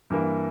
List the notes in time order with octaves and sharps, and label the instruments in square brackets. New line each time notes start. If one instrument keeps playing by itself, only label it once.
[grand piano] G2 E3 A#3